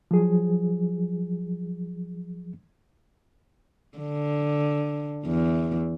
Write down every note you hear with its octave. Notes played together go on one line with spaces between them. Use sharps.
F3 F#3 G#4
D3
E2